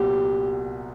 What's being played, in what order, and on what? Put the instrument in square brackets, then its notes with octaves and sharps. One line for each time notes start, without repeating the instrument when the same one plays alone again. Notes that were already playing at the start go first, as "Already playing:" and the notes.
Already playing: [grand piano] C2 A#2 F#3 B3 [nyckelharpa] G4